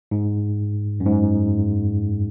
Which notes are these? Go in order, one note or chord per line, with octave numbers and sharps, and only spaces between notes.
G#2
F#2
G#2